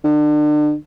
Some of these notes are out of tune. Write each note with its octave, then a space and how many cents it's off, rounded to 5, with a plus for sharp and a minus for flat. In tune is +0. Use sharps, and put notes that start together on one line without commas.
D3 +35